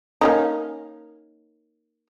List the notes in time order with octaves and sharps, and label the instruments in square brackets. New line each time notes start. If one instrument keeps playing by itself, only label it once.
[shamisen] A#3 C#4 D#4